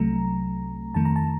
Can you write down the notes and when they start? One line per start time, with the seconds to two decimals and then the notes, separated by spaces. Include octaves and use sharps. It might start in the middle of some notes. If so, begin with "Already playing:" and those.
Already playing: C2 C3 F#3 A3 A#5
0.94 F2 D#3 A3 A5
1.05 A#5
1.16 A5